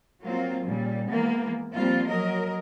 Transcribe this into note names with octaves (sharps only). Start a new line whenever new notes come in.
F#3 A#3 C4 F4
A#2 C#3 G3
E3 G#3 A#3 B3
F3 G3 A#3 C4 F4
F#3 A#4 D#5